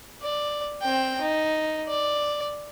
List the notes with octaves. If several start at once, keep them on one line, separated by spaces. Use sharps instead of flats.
D5
C4 G5
D#4
D5